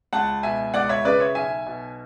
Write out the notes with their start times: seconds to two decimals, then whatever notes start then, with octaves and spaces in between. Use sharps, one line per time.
0.13 C#2 F#5 A5
0.43 B2 E5 G#5
0.74 C#2 D5 F#5
0.89 C#5 E5
1.05 C#3 B4 D5
1.20 C#5 E5
1.35 B1 E5 G#5
1.66 B2